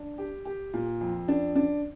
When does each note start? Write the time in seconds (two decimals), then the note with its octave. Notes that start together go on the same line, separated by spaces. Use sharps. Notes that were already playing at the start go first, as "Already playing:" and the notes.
Already playing: D4
0.18 G4
0.45 G4
0.74 A#2
1.01 F2
1.28 D4
1.56 D4